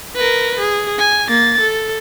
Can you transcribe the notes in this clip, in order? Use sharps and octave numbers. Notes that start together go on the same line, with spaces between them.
A#4 B4
G#4
G#5
A#3 A6
A4